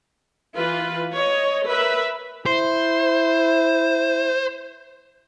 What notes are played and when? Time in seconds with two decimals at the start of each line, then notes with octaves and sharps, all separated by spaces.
0.56 E3 F4 B4
1.14 C#5 D#5
1.67 A#4 B4 E5 B5
2.46 E4 C5